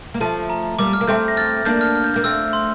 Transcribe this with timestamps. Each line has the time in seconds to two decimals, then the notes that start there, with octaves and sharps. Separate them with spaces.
0.14 A#3
0.20 F3 A3 A5
0.50 A#5
0.79 G3 A#3 D6
0.93 F6
1.01 A#3
1.08 A3 C4 G6
1.28 A#6
1.37 F6 A6
1.65 A#3 D4 G6
1.81 F6
1.95 F6
2.04 G6
2.14 A#3 G6
2.24 A3 C4 E6
2.53 C6